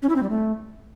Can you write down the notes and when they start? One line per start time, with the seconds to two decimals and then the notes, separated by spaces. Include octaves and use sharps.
0.02 C#4
0.09 E4
0.16 C4
0.23 G3
0.30 A3